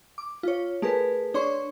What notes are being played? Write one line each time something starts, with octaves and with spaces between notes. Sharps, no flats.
D6
F4 C#5
A3 G#4 A#4 B4
D4 C#5 C6 C#6